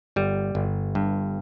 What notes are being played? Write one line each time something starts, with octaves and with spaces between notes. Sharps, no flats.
G1 G3
G1
G2